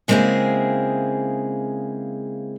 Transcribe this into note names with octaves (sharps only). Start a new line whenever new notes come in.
C#3 G#3 A#3 C4 E4 G#4